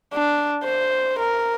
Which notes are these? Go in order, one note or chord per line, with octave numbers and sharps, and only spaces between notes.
D4
C5
A#4